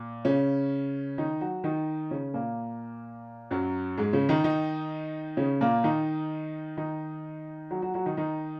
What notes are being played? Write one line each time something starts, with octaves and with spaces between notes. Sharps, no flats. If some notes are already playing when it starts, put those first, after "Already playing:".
Already playing: A#2
C#3 C#4
D#3 D#4
F#3 F#4
D#3 D#4
C#3 C#4
A#2 A#3
F#2 F#3
G#2 G#3
C#3 C#4
D#3 D#4
D#3 D#4
C#3 C#4
A#2 A#3
D#3 D#4
D#3 D#4
F#3 F#4
F#3 F#4
F#3 F#4
D#3 D#4
D#3 D#4